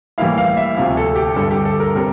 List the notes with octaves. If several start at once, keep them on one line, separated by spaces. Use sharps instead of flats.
A2 E3 G3 A#3 E4 F5
F5
E5
D2 C3 F3 F5
A4
G4
G2 D3 G3 A4
G4
A4
A#4
C3 G3 C4 A#4